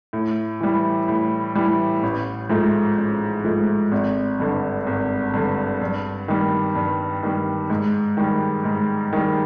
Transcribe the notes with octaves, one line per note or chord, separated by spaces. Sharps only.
A2
E3 G3
A2
E3 G3
A1
G#2 F3 A3
A1
G#2 F3 A3
G#1
G2 D3
G#1
G2 D3
G2
D#3 G3
G2
D#3 G3
G#2
D#3 G3
G#2
D#3 G3